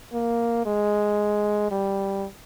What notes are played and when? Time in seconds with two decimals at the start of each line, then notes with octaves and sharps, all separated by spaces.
0.13 A#3
0.66 G#3
1.71 G3